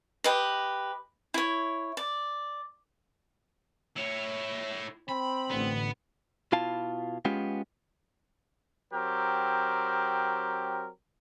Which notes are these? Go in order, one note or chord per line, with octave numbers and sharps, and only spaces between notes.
G4 B4 D#5
E4 C#5
D5
E4 C#5
C4 B5
A1 D3 B3
B2 E4 F4 F5 A5
G#3 B3 C#4 F4 G4
F#3 C4 G4 A#4